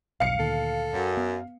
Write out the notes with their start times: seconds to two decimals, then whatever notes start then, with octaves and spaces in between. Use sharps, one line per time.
0.20 E1 B1 G2 F5 C#7
0.39 D2 A#2 D#3 A4
0.93 F#2
1.17 B3